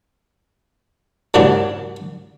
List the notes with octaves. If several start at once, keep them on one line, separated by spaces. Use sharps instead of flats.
D#2 G#2 C#3 F#3 D4